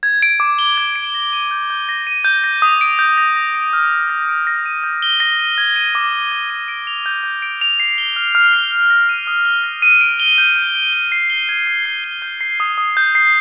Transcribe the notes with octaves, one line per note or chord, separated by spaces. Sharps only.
G#6
D7
D6
G7
G#6
D7
A#6
D#7
G6
G6
A#6
D#7
G6
A#6
D#6
D7
G6
A#6
A#6
D7
F6
F6
A#6
D7
A#6
D#7
G6
G7
A#6
D#7
G#6
D#7
D6
D6
G#6
D#7
D7
F7
G6
G6
D7
F7
C7
G7
F6
F6
C7
G7
A#6
D#7
D#6
G7
A#6
D#7
D7
G7
G6
G6
D7
G7
C7
G7
G#6
G#6
C7
G7
G6
C7
D#6
D#6
G6
C7